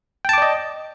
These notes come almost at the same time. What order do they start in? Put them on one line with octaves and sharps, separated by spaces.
G5 A5 D6 D5 D#5